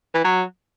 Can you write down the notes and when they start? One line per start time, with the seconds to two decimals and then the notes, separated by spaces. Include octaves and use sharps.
0.14 E3
0.24 F#3